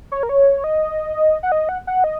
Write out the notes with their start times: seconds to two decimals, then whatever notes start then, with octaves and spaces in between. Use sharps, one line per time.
0.12 C#5
0.23 A#4
0.29 C#5
0.64 D#5
1.43 F#5
1.52 D#5
1.69 F#5
1.87 F#5
2.04 D#5